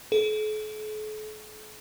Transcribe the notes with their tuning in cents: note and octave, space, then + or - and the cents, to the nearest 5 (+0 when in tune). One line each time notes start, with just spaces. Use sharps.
A4 -45